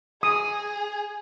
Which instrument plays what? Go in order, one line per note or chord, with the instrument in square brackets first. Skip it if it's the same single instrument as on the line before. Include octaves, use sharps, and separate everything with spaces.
[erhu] G#4 [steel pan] D#6